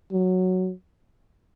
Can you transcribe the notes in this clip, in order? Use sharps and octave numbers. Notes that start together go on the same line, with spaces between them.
F#3